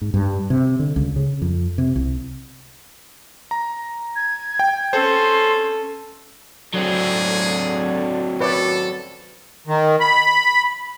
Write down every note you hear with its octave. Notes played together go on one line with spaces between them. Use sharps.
G#2
G2
C3
D3
C#2
C#3
F2
C3
C2
A#5
G#6
G5
C#4 A4 C5 C6
D3 F#3 C4 G#4
F#2 A4 B4 C#5 D5
D#3
B5